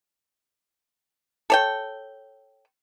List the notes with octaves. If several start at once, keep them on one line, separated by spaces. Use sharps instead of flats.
A4 C#5 G5